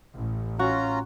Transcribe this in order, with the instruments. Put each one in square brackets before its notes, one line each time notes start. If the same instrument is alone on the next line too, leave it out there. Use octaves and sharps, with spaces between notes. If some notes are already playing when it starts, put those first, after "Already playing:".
[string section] A1
[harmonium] C#4 F4 A#5 [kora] F#4